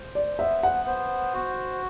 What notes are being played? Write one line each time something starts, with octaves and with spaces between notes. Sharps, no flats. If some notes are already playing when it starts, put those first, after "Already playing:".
Already playing: C5
D5
B3 E5
F#5
C5
F#4